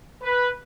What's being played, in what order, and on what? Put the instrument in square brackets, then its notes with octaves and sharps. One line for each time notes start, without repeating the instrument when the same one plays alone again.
[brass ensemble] B4